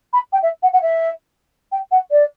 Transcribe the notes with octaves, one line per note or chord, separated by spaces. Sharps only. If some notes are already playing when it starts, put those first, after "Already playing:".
B5
G5
E5
F#5
F#5
E5
G5
F#5
D5